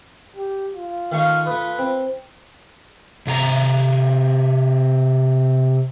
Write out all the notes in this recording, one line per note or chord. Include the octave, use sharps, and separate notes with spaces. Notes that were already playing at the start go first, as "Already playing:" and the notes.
G4
F4
D#3 A3 F5 C#6
A3 B4 D#6
C4
C3 G#4 A#5